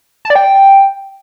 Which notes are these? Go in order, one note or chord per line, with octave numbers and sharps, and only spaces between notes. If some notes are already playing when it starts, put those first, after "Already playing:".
A5
D5
G5